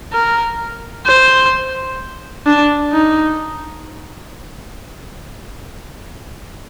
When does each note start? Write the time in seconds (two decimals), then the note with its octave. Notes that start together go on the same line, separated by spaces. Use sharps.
0.13 A#4
1.06 C5
2.46 D4
2.93 D#4